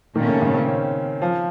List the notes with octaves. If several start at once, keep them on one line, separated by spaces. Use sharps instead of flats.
A#2 D#3 A3 C#4
C#3
C#3
C4
C#4
F3